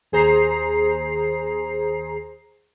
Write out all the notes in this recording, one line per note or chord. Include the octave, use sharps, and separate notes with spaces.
D#2 G#4 C5 A#5 C7